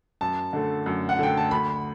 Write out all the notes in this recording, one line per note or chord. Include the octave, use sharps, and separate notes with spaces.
F#2 A5
D3 A3
F#2
F#5
D3 A3 G5
A5
D2 B5